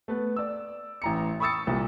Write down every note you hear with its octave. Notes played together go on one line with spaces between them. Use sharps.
A3 B3 B4
D5 E6
A1 A#5 C#7
B5 C#6 D#6 E6 A6 C#7
C2 A#2 G3